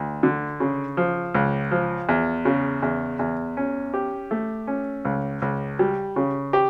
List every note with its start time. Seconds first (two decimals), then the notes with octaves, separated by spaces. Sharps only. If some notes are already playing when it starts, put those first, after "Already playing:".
Already playing: D2
0.23 D3
0.60 C#3
0.97 F3
1.35 C#2
1.71 F3
2.09 E2
2.45 C#3
2.82 E2
3.19 E2
3.57 C#4
3.94 G4
4.31 A3
4.67 C#4
5.05 C#2
5.42 C#2
5.79 G3
6.16 C#3
6.53 G4